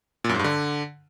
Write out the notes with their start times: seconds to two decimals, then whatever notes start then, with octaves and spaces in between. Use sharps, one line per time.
0.24 A#2
0.29 F#2
0.34 G#2
0.39 G2
0.44 D3